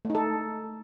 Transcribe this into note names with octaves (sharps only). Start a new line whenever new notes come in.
A3
D#4
A4